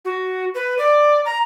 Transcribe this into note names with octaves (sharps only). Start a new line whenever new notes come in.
F#4
B4
D5
A#5